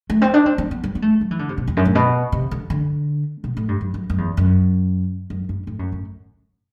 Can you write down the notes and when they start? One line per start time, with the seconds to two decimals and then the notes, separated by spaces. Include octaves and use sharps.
0.10 A3
0.22 C4
0.34 D4
0.46 C4
0.58 C4
0.71 B3
0.84 G3
0.95 B3
1.02 A3
1.21 F#3
1.31 E3
1.39 D3
1.49 C3
1.58 B2
1.67 E2
1.77 F#2
1.85 A2
1.95 B2
2.32 C3
2.51 D3
2.70 D3
3.44 B2
3.57 A2
3.68 G2
3.81 F#2
3.94 F#2
4.10 F#2
4.18 E2
4.37 F#2
5.30 F#2
5.49 G2
5.67 A2
5.79 F#2
5.92 A2